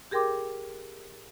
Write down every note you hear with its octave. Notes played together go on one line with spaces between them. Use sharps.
G4 G#4 A#4 G5 C6 D6